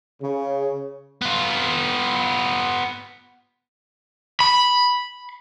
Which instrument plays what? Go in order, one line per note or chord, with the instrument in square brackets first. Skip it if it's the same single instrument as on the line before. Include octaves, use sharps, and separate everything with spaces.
[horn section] C#3
[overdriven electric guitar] B3 F4
B5